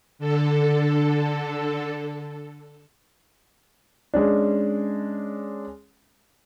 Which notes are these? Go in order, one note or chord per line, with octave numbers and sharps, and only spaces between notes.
D3 A4
G#3 C#4 D4